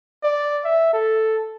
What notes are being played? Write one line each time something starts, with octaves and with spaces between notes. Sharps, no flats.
D5
E5
A4